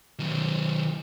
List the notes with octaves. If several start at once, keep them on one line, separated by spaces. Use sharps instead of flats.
D#3 F#3